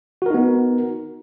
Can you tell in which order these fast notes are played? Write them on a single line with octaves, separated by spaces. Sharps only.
F#4 A#4 D#4 B3